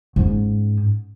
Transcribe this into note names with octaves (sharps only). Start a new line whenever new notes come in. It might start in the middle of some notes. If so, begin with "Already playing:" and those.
G#2 C#4